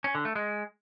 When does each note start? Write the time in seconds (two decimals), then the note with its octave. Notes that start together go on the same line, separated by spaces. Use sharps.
0.04 C#4
0.15 D3
0.25 A3
0.36 G#3